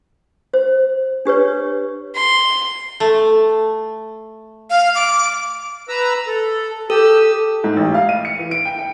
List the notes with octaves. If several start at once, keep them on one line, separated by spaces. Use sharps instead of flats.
C5
D4 G4 B4 C#5
C6
A3
F5
D6
B4 A#5 E6
A4
G4 A4 E6
G#2
A1
F5
D#7
C#7
E3
D7
G5
G5